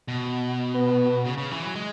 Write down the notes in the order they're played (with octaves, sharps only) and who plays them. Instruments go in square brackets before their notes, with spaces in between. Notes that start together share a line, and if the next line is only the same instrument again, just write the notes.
[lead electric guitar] B2
[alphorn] B3
[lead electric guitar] C#3
C#3
E3
F#3
G#3